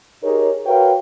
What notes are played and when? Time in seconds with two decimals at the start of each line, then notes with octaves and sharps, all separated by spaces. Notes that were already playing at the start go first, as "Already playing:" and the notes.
0.24 D#4 G4 G#4 A#4 C#5
0.66 F#4 A#4 B4 C#5 F5 G5